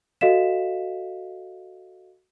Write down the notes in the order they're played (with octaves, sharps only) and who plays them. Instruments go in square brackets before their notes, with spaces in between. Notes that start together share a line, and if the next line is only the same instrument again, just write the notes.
[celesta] F#4 A4 D#5 F5 B6 E7